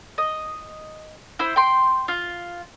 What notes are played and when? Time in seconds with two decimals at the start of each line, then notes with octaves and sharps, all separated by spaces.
0.18 D#5
1.39 E4 C5
1.56 G5 C6
2.08 F4